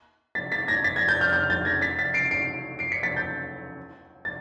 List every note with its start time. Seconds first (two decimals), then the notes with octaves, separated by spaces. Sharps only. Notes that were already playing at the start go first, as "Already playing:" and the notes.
0.35 A6 B6
0.52 A6 B6
0.68 G#6 A#6
0.84 A6 B6
0.96 G#6 A#6
1.08 G6 A6
1.21 F6 G6
1.33 F6 G6
1.50 G6 A6
1.65 G#6 A#6
1.81 A6 B6
1.99 A6 B6
2.14 C7 D7
2.31 C7 D7
2.79 C7 D7
2.92 B6 C#7
3.03 A6 B6
3.16 G6 A6
4.25 A6